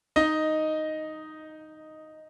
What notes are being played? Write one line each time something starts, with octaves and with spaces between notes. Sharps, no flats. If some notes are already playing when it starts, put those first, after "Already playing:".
D#4 D#5